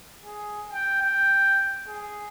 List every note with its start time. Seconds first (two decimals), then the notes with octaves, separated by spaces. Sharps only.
0.24 G#4
0.73 G5
1.02 G5
1.87 G#4